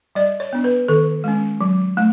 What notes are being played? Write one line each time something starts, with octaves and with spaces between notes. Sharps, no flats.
G3 D5
C#5
B3 D4
B4
D#3 A4
G#3 C#4
F#3
A3